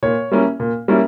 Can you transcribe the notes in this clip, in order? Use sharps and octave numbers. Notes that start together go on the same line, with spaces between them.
A#2 C#5
G3 A#3 C#4 E4
A#2
G3 A#3 C#4 E4